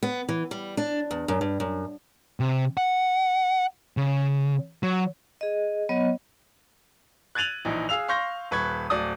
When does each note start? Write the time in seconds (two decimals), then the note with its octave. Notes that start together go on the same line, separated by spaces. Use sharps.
0.03 B3
0.29 E3
0.51 G3
0.77 D4
1.11 E2
1.28 F#2
1.41 G2
1.60 F#2
2.40 C3
2.77 F#5
3.97 C#3
4.83 F#3
5.41 G#4 D#5
5.89 F#3 B3 C#5 D#5
7.35 F#6 G#6 A6 D#7 F7 F#7
7.65 A#1 E3 D#4
7.89 G#4 F5 E6 F7
8.08 F5 C6 C#6 G6 A#6
8.51 D#1 B4 C#6 G#6
8.90 D1 D5 D#6